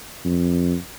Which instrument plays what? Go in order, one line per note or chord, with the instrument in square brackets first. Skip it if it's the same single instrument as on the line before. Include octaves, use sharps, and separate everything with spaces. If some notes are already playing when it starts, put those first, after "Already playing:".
[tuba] F2